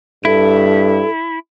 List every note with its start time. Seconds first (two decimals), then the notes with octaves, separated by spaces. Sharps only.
0.25 G2 E4 A4